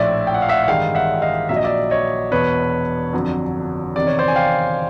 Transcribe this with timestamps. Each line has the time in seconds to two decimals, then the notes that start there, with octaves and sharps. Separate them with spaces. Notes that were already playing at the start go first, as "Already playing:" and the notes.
Already playing: A#1 A2 F3 D5 E5
0.27 G5
0.34 F#5
0.42 F5
0.49 E5 F#5
0.64 F#5
0.68 A1 G2 D#3 G#3 F5 G5
0.95 E5 F#5
1.22 D#5 F5
1.49 A#1 A#2 F#3 E5
1.56 D#5
1.64 D5 E5
1.90 C#5 D#5
2.32 E1 E2 B2 B4 C#5
3.13 G1 F2 D3 F#3
3.95 E2 C3 D#3 D5
4.07 C#5
4.19 C5 D5
4.28 G#5
4.36 F5 G5